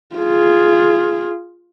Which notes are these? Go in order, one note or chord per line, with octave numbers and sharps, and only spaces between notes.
F4 G#4